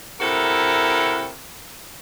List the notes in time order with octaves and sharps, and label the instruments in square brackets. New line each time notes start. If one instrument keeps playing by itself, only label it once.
[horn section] C3 E4 F#4 A4 A#4